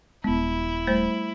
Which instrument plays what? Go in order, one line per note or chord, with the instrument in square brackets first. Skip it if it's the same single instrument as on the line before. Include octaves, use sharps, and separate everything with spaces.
[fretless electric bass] D#1 G#3 [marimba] B3 [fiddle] E4
[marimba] G3 A3 C5